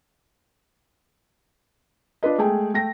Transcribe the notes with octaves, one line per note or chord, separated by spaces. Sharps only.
D4 F4 B4 D#5
G#3 A3 G#4 G5 G#5
A3 G5 A#6